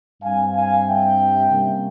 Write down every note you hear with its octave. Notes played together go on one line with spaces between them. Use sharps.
G2 G3 C4 F5 G#5
F5 G#5
E5 G5
C3 G3 A#3 C#4